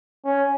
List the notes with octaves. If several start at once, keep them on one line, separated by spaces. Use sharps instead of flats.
C#4